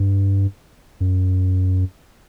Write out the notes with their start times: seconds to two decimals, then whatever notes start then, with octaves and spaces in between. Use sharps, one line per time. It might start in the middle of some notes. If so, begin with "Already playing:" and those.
Already playing: G2
1.00 F#2